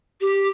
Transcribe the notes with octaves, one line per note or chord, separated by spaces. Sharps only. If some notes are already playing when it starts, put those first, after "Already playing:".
G4